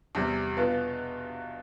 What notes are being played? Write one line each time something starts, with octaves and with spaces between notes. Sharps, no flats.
E2 C3 G3
B2 B3 F4